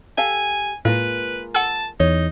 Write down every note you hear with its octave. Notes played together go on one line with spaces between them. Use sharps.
G4 A4 F5 G#5
A2 G#3 A#3 F4 B4
F#5 A5 E6
E2 D#4 C#5